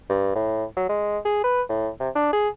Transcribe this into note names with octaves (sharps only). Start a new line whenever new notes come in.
G2
A2
F#3
G#3
G#4
B4
A2
C3
D4
G#4